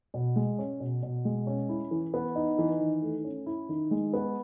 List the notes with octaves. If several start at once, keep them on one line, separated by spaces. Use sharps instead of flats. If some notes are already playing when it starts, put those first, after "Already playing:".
B2
G#3
C#4
B2
B2
G#3
C#4
E4
E3
B3
D#4
E3
D#3
A3
C#4
E4
D#3
G#3
B3